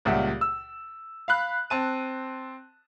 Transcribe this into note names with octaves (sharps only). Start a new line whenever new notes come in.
C#2 A#2 G3 E5 F#5
E6
F5 B5 F#6
C4 A5 D#7